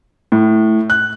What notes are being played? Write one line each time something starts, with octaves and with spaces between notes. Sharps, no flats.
A2
F#6